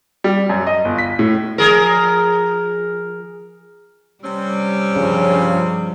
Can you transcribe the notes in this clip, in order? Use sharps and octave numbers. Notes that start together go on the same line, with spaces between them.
G3
F#2
D#5
G1
B6
A2
F3 G#4 A#4
C3 G3 C4 C#4
G2 C#3 F3